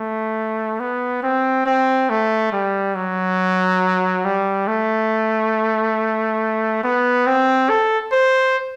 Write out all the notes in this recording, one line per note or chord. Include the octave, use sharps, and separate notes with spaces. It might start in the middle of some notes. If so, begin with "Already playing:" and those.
Already playing: A3
B3
C4
C4
A3
G3
F#3
G3
A3
B3
C4
A4
C5